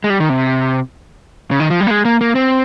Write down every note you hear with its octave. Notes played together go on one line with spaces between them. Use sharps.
G#3
G3
D#3
C3
C#3
D#3
F3
G3
A#3
G#3
A#3
A#3
C4